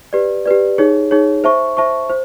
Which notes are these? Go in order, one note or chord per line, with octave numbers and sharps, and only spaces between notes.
G4 B4 D5
G4 B4 D5
D#4 G#4 C#5
D#4 G#4 C#5
C5 E5 A5 C#6
C5 E5 A5 C#6
C5